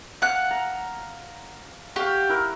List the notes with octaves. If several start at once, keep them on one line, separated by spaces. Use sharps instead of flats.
F5 F#5 A5 F#6
A#5
F#4 G4 F5
E4 A#4 F#5